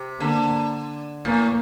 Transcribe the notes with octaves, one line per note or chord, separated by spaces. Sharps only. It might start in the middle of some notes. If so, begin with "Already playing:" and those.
Already playing: C3
D3 A#3
A2 A#3